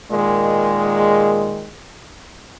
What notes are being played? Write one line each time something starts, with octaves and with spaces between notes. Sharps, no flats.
A#2 D#3 G#3